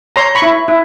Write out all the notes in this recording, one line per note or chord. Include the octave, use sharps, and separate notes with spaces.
C#5 A#5 C6
B5 C#6
E4
E4